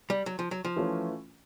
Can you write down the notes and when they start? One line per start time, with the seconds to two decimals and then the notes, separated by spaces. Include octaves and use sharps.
0.10 G3
0.26 F#3
0.39 F3
0.51 F#3
0.65 F3
0.76 E3 A3 C#4 F4